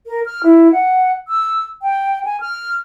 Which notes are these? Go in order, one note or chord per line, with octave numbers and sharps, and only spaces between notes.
A#4
F6
E4
F#5
E6
G5
G#5
F6